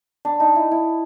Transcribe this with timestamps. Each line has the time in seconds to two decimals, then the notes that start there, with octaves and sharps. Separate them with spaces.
0.25 D4
0.40 D#4
0.56 E4
0.71 E4